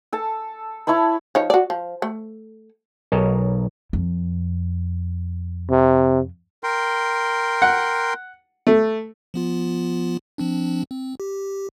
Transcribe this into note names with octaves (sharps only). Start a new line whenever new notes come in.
A4 A5
E4 C#5 A5 B5
F3 D#4 C#5
F#4 D5
F3
A3
B1 A#4 C#5 D#5 A5
F2
C3
A#4 G5 C6
F#5
A3
F3 B3 F4
F3 C4 D4
C4
G4